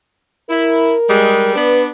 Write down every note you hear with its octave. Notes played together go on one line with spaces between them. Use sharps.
E4 A#4
G3 G#3
B3 D4 B4